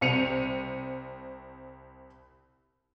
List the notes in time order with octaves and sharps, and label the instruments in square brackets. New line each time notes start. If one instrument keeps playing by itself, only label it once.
[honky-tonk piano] C2 C4 C#7 D#7 F7